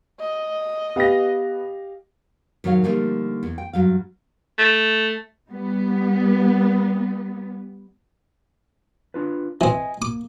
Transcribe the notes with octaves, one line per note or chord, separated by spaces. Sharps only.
D#5
B3 G4 F5 A#6
G#2 D#3 F#3 C#5 F5
D3 F3 G3 A3 A#3 D#4
E2
G5
G2 F#3 F5
A3
G3 B3
D4 F4 B4
E3 C4 D#5 E5 G#5
A#3 D6